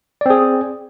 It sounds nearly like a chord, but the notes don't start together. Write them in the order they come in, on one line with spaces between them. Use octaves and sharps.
D5 C4 G#4